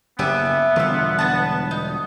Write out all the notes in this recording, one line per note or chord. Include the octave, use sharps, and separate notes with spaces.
F#1 B3 G4 E5 G#5
E1 D3 G3 F4 F5 E6
B4 F#5 A5
D#4